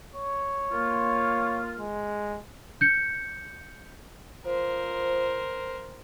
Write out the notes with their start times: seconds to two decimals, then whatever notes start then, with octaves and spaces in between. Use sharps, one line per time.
0.15 C#5
0.72 A#3 F4
1.79 G#3
2.81 G6 C#7
4.45 F3 A#4 C5